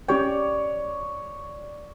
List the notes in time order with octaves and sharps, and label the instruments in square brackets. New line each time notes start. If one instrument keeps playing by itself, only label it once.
[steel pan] C#4 G4 G5 [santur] C#5 D5